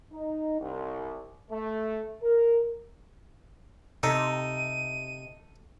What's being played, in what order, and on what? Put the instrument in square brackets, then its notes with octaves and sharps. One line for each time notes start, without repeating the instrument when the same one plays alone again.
[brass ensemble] D#4
C2
A3
A#4
[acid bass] C3 [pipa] D#4 [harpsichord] A4 [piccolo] D#7